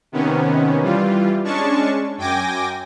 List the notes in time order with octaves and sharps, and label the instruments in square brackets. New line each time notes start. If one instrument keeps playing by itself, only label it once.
[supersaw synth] C3 D#3 B3 C#4
E3 G3 F4
G#3 C#4 D4 A5 C#6
F#2 G5 G#5 D6 A#6